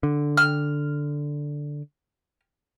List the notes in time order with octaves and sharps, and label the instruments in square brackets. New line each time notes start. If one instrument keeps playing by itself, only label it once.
[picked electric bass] D3
[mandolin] F6